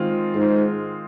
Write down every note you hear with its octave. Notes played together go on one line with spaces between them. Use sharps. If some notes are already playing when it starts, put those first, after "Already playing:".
Already playing: D#3 G#3 C4 F4
G#2